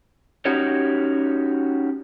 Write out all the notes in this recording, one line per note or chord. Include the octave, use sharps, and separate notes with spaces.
C#4 D#4 F#4 G4 C#5